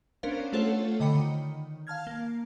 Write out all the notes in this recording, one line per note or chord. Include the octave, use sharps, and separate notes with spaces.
B3 C#4 D4 A#4 C5 F5
A3 F4 A4 C5 C#5 F#5
D3 D#5 G5 B5 C#7
D#3
F5 A5 F6 G#6
A#3